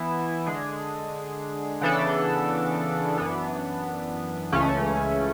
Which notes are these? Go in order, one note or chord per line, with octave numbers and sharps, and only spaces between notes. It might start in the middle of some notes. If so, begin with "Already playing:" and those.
Already playing: E3 B3 E4
D3 G#3 D4 G#4
C#3 E3 B3 D4 A4
F#2 E3 B3 D4
C#2 C#3 E3 A3 C#4